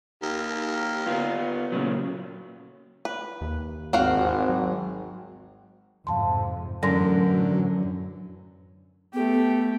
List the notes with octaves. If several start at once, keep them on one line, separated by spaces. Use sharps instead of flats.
D#2
B3 F4
A#2 C#3 F#3
B4
D#2
G#1 C4 F#4 F5
F#3
F2 G#2 C3 F5 A5 C6
F#2 A2 D3 E3 F#3 C#4 C6 A#6
A3 B3 G4